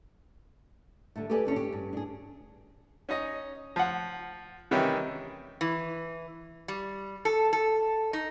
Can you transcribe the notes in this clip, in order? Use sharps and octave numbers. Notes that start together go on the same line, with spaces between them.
D3 G3 A3
G4 A4 B4 D5 D#5 G#5
D3 C#4 D4 E4
G4
G2
D4 G#4
C#4 D#4 D#5
F3 F#5
C3 D#3 E3 G3 C#4 G4
E3
G3
A4
A4
D#4